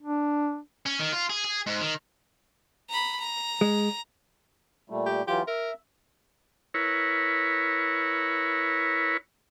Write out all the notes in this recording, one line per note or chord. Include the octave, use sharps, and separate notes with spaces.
D4
C#4
D#3
F4
G#4
G#4
G#2
D#3
A#5 B5
A#5
G#3
A#2 G3 A3
G4
E3 F#3 F4 G4
A#4 E5
E4 A#4 B4 C#5